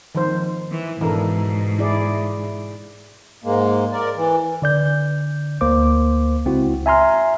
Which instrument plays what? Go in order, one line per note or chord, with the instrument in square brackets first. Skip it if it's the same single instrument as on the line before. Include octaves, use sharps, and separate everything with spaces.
[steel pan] D#3 F3 C5
[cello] E3
[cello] G#2 [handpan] B2 D4 A4 [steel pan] E3 A#4
[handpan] E4 G#4 D5
[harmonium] G#2 G#3 A#3
A#4 D5
E3
[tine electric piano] D3 D5 G6
D2 A#3 C5 D6
C#2 C4 E4 F#4
E5 G#5 A#5 C6 F6